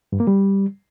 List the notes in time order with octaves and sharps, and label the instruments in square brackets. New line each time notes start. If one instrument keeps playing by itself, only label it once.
[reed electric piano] G2
A#3
G3